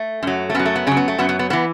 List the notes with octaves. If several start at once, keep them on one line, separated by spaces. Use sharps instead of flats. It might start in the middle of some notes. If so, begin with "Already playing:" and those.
Already playing: A3
F#2 F#3
A3
F#2 F#3 B3
A3
B3
F#2 C#3 F#3 C#4
B3
A3
F#2 F#3 B3
B3
B3
A2 E3 B3